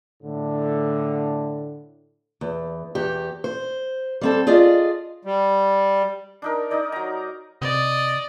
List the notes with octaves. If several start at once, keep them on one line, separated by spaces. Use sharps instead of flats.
A2 D3
E2
E2 G4
C5
G3 C4 A4
F4 G#4 D5 D#5
G3
D4 D#4 A#4
D#4 D5 D#5
F#3 A#5
C3 D5 D#5